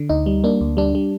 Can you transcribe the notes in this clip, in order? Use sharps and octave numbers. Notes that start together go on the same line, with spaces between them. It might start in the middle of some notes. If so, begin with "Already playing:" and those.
Already playing: D3
D2 D#4
G3
A#3 D4
D2
G3 D4
G3